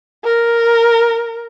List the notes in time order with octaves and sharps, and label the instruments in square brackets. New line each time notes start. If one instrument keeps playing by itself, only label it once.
[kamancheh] A#4